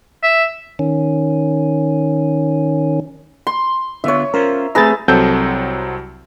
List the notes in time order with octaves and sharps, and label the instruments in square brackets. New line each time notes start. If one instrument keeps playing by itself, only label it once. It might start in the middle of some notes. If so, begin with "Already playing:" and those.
[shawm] E5
[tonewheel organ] D#3 C#4
[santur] C6
[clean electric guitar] D3 B3 F4 [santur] C#5 E5
[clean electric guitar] C#4 F4 C5 [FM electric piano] A#4
[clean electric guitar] A3 C4 G4 [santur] G#4 B4 E5 [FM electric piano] A#5 A6
[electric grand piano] C2 F#3 C4 A4 G6